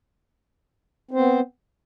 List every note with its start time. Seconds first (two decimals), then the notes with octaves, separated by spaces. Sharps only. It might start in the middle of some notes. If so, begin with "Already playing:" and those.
1.11 C4
1.14 C5
1.16 B3